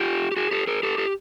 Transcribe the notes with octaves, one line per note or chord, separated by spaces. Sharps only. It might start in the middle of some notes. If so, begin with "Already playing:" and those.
Already playing: F4 G4
G4
F#4 G#4
G4 A4
G#4 A#4
G4 A4
G4 A4